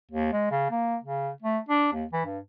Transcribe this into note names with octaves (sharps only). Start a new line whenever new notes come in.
D#2
G#3
C#3
A#3
C#3
A3
D4
D#2
E3
G2